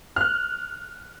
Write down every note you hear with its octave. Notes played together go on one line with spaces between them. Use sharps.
F6 F#6